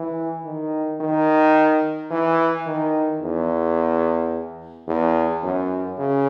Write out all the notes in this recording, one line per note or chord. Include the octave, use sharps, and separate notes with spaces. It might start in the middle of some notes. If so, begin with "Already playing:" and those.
Already playing: E3
D#3
D#3
E3
D#3
E2
E2
F#2
C#3